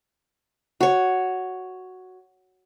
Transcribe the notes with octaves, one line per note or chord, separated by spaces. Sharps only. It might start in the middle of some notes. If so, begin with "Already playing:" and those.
F#4 C#5